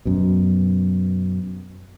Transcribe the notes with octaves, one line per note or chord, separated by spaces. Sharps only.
F#2 B2